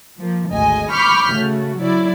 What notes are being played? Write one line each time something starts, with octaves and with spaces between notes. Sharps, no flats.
F3 A#3
G#1 D2 G#3 D#5 G#5
B5 C#6 D6 F6 G6 B6
C#3 A3 F#4
C#3 F#3 E4 D5